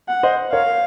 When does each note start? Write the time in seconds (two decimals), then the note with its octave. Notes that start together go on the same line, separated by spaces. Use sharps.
0.08 F#5
0.23 C5 D#5
0.53 A#4 C#5 F5